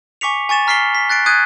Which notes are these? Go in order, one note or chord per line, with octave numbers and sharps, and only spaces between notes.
G#5 C#6 D6 B6 C#7 F7
G#5 C#6 A6 E7
A#5 F6 B6 C7 D7 G7
B6
F#6 A6 C7 D7
D#6 F#6 G#6 C7 D7 D#7